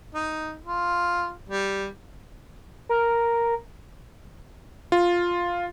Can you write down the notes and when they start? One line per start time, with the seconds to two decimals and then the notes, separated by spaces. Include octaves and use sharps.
0.15 D#4
0.65 F4
1.49 G3
2.89 A#4
4.92 F4